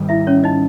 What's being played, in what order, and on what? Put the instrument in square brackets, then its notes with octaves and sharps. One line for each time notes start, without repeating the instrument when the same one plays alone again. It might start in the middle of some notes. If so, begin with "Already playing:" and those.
Already playing: [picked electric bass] G#2 D#3 G3
[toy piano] E4 E5
C#4 C#5
D#4 D#5